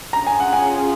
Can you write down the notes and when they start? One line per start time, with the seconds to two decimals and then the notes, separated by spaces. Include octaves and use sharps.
0.13 C#4 F4 G#4 A#5
0.27 G#5
0.40 F#5
0.53 G#5